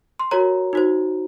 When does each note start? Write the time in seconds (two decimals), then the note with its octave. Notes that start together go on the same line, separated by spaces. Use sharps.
0.19 C6
0.31 F#4 A#4 C#5 A#5
0.73 D#4 F#4 C5